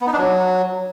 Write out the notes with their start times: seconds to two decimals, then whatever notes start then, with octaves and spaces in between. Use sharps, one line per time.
0.01 B3
0.07 D#4
0.13 D4
0.19 F#3